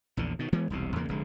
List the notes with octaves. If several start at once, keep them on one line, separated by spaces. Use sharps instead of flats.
A#1 E2 D3
B2 D#3
E3 G#3 B3
E1 C2 C3
E2 C#3 A#3
F1 D3 G#3